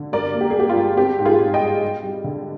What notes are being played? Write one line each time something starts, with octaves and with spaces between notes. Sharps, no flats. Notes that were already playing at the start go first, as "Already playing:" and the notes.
Already playing: D3
G2 A#4 D5
A#3
G4
G#4
A#3 G4
F4
G2
C4 G4
G#2
F4 G#4
G#2
D#5 G5
G3
G3
G3
D3